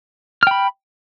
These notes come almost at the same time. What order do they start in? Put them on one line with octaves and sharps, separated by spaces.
F6 G5 B5